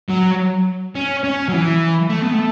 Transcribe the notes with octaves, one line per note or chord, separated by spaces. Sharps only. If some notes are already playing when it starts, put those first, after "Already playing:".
F#3
C#4
C#4
F#3
E3
A3
B3
A3